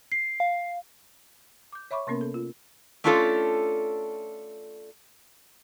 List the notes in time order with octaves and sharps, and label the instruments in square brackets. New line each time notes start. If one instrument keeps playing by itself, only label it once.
[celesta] C7
[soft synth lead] F5
[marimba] D6 G6
C#5 E5 B5 C#6 D6
C3 A#3 B3 C#4 A#4
A4
F4
[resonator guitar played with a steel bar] A3 C#4 D4 F4 G4 A4